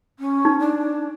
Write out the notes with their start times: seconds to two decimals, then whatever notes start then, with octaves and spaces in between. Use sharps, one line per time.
0.19 C#4
0.45 D#4
0.59 D4